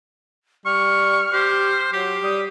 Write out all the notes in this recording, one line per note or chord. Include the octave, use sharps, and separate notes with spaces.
G3 C#6 F6
G4 C5
F#3 G4
G3 D#6